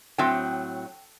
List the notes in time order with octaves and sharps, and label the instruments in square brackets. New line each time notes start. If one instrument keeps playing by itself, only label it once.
[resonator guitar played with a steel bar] A2 F#3 C4 G5